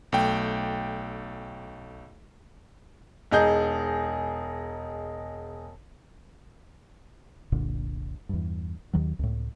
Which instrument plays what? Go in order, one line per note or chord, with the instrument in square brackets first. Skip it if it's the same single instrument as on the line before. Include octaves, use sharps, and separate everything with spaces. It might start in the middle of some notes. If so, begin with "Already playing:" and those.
[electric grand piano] B1 A3 G5
[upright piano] E1 D#4 G#4 G6
[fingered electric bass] F1 C2 A#2 D3
E2 G2
D#2 D#3 F#3
C#2 A2